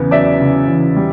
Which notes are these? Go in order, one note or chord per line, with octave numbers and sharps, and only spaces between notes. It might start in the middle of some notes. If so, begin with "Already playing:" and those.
Already playing: E2 C#3 B3
F#3 D5 E5
C#3
E2
G3